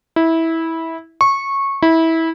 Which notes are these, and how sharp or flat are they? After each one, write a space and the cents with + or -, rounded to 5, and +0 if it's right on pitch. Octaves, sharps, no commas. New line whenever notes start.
E4 -15
C#6 -15
E4 -20